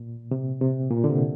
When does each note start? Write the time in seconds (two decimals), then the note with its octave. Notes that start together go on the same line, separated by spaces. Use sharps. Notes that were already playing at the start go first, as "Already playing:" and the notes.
Already playing: A#2
0.31 C3
0.61 C3
0.90 A#2
1.04 D3
1.09 C3